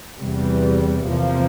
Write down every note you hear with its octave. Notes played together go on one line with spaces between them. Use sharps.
E2 C3 G3
E2 C3 F3 A#3